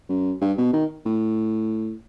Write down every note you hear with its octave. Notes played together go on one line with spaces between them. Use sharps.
F#2
G2
B2
D#3
A2